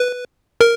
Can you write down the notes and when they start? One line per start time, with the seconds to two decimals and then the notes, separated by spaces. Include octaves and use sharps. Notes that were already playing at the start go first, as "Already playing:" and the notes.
Already playing: B4
0.61 A#4